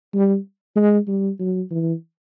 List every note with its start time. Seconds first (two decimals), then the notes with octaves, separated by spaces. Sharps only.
0.15 G3
0.76 G#3
1.08 G3
1.40 F#3
1.71 E3